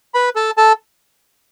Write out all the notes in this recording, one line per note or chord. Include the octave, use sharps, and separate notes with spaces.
B4 B5
A4 A5
A4 A5